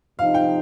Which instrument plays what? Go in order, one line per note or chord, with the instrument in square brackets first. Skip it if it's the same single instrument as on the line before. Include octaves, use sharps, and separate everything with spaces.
[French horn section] C3 F3 D#4 [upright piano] F5
[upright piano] G5